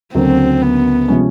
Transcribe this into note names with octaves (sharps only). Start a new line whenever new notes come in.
D2 C#3 F#3 A#3 C4
B3
C3 F3 G#3 C#4